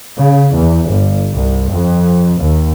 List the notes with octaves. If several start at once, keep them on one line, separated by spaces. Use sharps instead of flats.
C#3
E2
G1
C2
F2
D#2